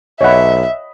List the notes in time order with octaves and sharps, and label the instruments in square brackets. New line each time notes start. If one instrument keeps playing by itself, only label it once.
[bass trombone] B1 [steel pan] C#5 F#5 [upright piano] D#5 B5 [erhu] E5